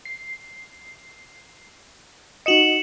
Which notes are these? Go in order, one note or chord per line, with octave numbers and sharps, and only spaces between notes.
C7
D#4 F#4 D#5 C#7 E7 F#7